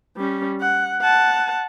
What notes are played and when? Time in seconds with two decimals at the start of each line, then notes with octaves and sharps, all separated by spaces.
0.17 G3 C#4
0.61 F#5
1.01 F#5 A5